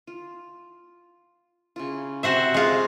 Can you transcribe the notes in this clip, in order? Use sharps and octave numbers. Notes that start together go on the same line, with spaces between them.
F4
C#3 E4 F4
C3 F#4 C5 E5 A#5
G#3 F4